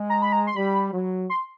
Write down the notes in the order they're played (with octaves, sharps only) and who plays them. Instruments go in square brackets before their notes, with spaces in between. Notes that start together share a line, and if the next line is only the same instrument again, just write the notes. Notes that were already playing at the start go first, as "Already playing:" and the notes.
Already playing: [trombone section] G#3
[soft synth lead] A#5
B5
A#5
C6
[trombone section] G3 [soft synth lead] B5
[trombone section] F#3
[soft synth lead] C6